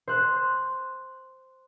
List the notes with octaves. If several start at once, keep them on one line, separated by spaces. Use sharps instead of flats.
C5 F#6